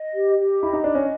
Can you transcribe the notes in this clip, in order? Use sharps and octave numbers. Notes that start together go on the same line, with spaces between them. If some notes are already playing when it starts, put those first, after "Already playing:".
Already playing: D#5
G4
G4
E4 D#5
D#4
D4 D#5
C#4